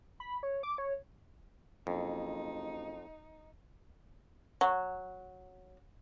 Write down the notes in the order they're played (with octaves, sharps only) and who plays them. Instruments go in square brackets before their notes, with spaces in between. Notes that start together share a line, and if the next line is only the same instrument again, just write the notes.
[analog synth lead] B5
C#5
D6
C#5
[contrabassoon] F#1 [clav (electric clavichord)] F2 [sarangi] D#4
[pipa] F#3